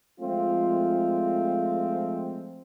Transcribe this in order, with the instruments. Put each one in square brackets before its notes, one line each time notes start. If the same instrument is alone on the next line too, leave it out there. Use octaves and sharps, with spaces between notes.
[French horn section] F3 G#3 A3 C4 F4